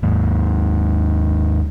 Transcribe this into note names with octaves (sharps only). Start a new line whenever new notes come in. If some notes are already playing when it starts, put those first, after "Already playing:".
D#2 G#2